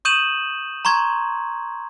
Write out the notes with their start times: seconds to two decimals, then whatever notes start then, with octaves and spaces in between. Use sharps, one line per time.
0.05 C#6 D#6 G6 D#7 E7 F#7
0.85 A#5 C6 C#6 G#6